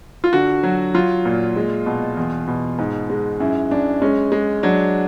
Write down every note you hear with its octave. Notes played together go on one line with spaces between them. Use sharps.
F4
D3 F#4
F#3
F#3 F4
A#2
G#3
B2
E2
B2
G#2
G#3
F#2 E4
F#2 D4
G#3 C#4
G#3
F#3 D4